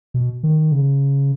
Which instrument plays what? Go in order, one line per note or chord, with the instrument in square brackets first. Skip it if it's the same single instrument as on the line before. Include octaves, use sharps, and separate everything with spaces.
[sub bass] B2
D#3
C#3